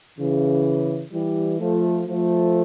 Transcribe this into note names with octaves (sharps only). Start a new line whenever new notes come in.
C#3 E3
E3 G3
F3 A3
F3 A3